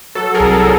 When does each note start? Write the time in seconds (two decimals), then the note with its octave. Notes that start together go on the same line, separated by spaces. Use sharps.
0.15 F#3 A4
0.34 G#4 A#4
0.40 C2
0.53 A4